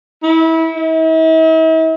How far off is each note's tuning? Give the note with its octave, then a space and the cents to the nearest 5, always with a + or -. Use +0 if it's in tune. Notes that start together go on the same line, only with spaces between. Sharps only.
E4 -25
E4 -45